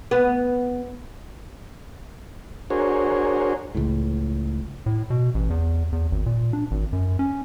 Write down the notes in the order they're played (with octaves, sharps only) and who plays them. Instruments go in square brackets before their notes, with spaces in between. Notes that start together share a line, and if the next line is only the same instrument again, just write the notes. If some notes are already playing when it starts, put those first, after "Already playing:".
[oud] B3
[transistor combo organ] D4 F#4 G#4 A#4 C5 C#5
[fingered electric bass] C#2 A2
[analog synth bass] A2
B2
A1
E2
E2
G#1
A#2
D4
G#1
F#2
C#4